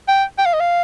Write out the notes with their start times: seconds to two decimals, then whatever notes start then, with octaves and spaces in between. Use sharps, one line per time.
0.08 G5
0.38 G5
0.46 F5
0.53 D#5
0.60 F5